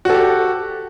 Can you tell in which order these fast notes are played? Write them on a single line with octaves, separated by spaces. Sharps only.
F#4 A4 G4